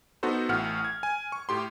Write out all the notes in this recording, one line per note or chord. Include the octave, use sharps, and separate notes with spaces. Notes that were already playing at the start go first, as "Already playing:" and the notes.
B3 D#4 F#4 A4 C5
A1 A2 F#5 F6
G#6
G#5
C#6
A2 G4 C6